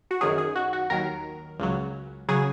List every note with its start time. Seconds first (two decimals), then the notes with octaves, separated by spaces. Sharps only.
0.11 F#4
0.21 F#2 D#3 F#3 G#4
0.38 G#4
0.56 F#4
0.73 F#4
0.90 D#2 D#3 F#3 A#4
1.59 C#2 C#3 F#3
2.28 C#3 F#3 G#4